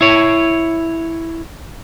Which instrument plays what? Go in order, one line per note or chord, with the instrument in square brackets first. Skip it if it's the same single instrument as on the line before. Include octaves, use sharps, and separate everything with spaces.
[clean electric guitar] E4 C#5